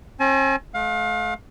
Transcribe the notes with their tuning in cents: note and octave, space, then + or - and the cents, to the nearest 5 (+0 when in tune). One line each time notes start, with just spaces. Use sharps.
C#4 -45 G#5 +40
A3 -35 F5 +30